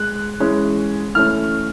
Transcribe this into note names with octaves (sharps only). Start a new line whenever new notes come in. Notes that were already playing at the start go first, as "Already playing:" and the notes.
Already playing: G#3 F#6
E3 G#3 C#4
E3 A3 C#4 F6